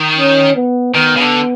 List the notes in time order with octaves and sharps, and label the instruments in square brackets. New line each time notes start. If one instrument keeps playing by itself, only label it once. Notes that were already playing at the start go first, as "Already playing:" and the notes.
Already playing: [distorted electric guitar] D#3
[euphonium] C#4
B3
[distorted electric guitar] D#3 [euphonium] B3
[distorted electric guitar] C#3
D3